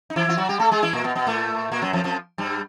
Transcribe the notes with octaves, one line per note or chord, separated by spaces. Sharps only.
D#4
E3 E4
F4
F#3 F#4
G3 G4
A3 A4
G#3 G#4
E3 E4
A#2 A#3
B2 B3
B2 B3
A2 A3
A#2 A#3
F#2 F#3
F2 F3
F2 F3
G2 G3